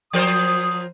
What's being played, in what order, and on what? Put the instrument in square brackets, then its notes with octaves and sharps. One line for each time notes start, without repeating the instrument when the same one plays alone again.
[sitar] F3 A#4 C5 [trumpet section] D#6